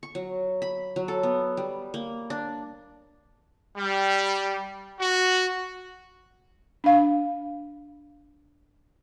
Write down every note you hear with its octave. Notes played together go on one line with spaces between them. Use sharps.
C#6
F#3
B5
F#3
A4
B3
G3
A#3
D4
G3
F#4
D4 F5